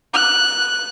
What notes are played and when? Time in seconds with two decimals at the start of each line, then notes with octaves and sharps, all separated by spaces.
0.14 F#6